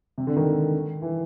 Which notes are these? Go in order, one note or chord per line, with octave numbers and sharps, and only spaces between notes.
C3
D3
D#3
E3